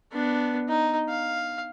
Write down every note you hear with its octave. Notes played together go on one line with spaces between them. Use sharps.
B3 D4
D#4
F5